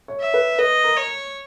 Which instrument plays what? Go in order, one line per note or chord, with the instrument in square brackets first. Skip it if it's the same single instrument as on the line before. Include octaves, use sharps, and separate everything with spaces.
[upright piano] C#5
[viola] E5
[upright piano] B4
[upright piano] B4 [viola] D#5
[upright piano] A#4
[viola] C#5